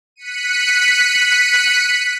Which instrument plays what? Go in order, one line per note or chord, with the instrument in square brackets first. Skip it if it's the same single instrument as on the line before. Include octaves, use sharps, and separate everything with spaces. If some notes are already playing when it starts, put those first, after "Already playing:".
[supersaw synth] F#6 B6 C#7 D#7